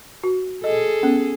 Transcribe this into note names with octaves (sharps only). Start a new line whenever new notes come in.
F#4
G#4 A4 D#5
B3 C#4